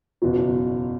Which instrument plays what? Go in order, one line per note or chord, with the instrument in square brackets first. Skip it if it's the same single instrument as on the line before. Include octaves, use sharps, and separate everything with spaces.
[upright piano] F#1 E2 B2 F#3